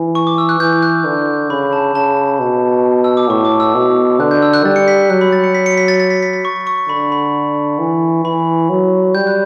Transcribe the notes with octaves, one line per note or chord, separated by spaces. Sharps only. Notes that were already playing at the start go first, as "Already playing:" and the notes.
Already playing: E3
C#6
D6
E6
F#6
E3 G6
F#6
D3
C#3 B5
A5
C#3 A5
B2
E6
D6
A2 C#6
D6
E6
B2
D3 F#6
G6
E6
F#6
G3 A6
C#7
B6
F#3 F#6
B5
A6
C#7
B6
C#7
B6
A6
A6
B6
B6
A6
C#6
C#6
D3 B5
B5
E3
E3 B5
F#3
G3 G6
F#6